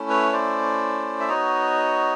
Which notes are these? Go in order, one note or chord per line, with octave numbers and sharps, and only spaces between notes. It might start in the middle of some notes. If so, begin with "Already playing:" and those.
Already playing: A3 C#4 E4
B4 C#5
C5 D5
E5
B3 D#4 F#4 C#5 D#5